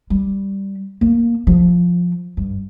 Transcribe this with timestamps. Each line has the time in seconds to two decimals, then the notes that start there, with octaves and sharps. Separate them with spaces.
0.10 G3
1.01 A#3
1.47 F3
2.37 G2